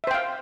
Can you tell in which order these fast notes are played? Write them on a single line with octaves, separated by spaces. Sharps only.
E5 C5 G5 F5